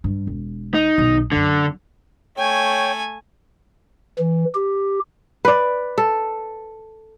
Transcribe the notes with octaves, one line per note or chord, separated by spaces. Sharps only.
G2
E1
D#4
B1 D#3
F#1 F#2 D3
A3 C#5 G5 G#5
E3
G4
B4 D5
A4